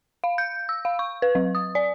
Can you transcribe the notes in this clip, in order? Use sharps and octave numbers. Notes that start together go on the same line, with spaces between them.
F5
G6
E6
F5
C#6
B4
F#3
D#6
D5